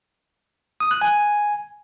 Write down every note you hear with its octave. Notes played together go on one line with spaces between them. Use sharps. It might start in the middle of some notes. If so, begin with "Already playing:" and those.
D#6
F#6
G#5